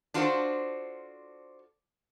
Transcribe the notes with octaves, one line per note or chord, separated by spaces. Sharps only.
D4 F4 F#4 A4 A#4 C5